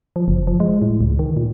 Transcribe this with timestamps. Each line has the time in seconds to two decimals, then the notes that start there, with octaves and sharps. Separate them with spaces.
0.16 F3
0.28 F#1
0.47 F3
0.60 G#3
0.82 A2
1.01 C#2
1.19 D#3
1.37 A#2